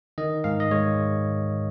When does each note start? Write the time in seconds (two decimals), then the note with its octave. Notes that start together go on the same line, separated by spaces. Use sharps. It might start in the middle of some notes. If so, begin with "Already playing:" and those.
0.18 D#3 D#5
0.44 G#2 F5
0.60 D#5
0.71 G#3 C#5